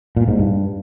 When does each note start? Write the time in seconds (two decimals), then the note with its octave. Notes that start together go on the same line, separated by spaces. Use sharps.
0.17 A#2
0.28 G#2
0.39 G2